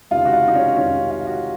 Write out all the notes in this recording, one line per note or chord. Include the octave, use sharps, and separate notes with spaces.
C#2 C3 D#3 F4
F#4
F4
D#4
C#4
C#2 C3 D#3 C#4
F4
F#4